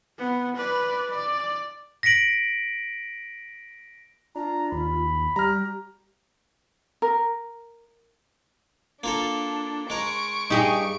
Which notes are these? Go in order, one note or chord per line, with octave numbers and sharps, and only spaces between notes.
B3
B4 D5
D5
A#6 B6 C#7 D7 F#7
D4 F4 A#5
D#2 B5
G3 G4 A#5 F6
A#4
A#3 D4 F4 A4
G#3 A#4 C#6 D7
G2 D#4 G4 G#4